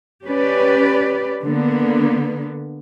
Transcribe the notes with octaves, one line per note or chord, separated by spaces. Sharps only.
C#4 G4 B4 D5
D3 A#3 B3